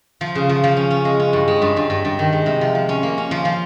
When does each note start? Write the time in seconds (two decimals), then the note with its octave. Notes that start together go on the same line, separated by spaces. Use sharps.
0.21 F3
0.35 C#3
0.49 F3
0.64 F3
0.77 C#4
0.91 C#4
1.05 G#3
1.20 C#4
1.33 G2
1.48 G#3
1.62 G2
1.76 G2
1.90 G2
2.05 G2
2.19 D#3
2.33 G#3
2.46 C3
2.61 F3
2.75 F3
2.89 C#4
3.03 A#3
3.18 C#4
3.31 F3
3.45 F3